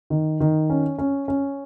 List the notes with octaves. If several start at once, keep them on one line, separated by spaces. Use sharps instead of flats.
D#3
D#3
C#4
C#4
C#4